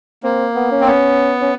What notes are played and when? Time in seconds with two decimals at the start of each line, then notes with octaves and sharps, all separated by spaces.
0.23 A#3 C4
0.56 B3
0.72 C#4
0.81 C4
0.87 B3 C#4
1.41 C#4